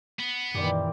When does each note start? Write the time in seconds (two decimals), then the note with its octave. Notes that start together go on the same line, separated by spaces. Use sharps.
0.20 B3
0.55 F#2 A#2 D#3 E3 G3 D5 C6